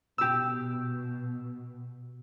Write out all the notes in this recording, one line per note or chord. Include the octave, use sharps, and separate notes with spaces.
B2 G4 E6